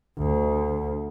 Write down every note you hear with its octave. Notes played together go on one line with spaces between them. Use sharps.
D2